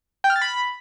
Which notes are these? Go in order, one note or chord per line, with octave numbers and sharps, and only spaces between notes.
G5
F6
A6
B5